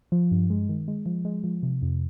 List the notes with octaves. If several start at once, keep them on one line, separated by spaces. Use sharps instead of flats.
F3
G2
G#3
D#3
G#3
F3
G#3
F3
C3
F2